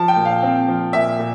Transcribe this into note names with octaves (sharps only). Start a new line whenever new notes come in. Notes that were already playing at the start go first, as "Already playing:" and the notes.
Already playing: F3 A5
G5
A#2
F5
C4
F3
A#2 E5
A#2